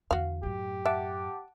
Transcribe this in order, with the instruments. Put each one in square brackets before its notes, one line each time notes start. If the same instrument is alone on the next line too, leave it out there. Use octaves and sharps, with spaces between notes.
[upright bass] E2 D3 [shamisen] F#4 F5
[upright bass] F#2 A2 [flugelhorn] G4
[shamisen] E5 [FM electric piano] F#5 A5 D6